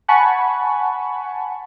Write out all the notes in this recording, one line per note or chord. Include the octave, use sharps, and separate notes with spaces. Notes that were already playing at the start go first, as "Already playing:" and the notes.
F#5 G#5 A5 B5 C#6